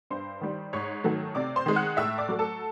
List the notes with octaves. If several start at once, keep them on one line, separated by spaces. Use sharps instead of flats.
G2 C5 C6
D#3 G3
G#2 C#5 C#6
D#3 F#3 A3
C3 D5 D6
C5 C6
D#3 G#3
F#5 F#6
A2 E5 E6
D5 D6
F#3 A3
A4 A5